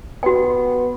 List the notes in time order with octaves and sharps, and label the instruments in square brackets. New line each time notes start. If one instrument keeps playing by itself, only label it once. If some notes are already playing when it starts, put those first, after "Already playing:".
[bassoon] B3 [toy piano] F#4 G5